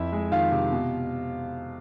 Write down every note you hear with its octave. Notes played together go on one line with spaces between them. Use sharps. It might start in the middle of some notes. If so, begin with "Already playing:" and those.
Already playing: F2 E4 E5
G#3
D#3 F4 F5
C3
B2